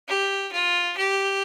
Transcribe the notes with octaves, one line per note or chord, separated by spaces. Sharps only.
G4
F4
G4